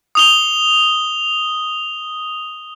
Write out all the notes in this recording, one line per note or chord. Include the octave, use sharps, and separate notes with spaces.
D#6 F7 G7